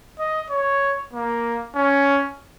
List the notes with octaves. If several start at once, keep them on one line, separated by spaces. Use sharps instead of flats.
D#5
C#5
A#3
C#4